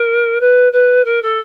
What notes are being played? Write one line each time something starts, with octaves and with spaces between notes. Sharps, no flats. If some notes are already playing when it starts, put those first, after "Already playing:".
Already playing: A#4
B4
B4
A#4
A4